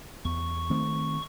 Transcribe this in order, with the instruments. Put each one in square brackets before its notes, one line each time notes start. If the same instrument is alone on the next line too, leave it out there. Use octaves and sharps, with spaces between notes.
[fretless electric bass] E2 [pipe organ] C#6
[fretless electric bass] D#3 A3 C4